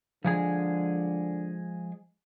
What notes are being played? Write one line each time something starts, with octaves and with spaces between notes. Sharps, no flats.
D3 F3 G#3 G#4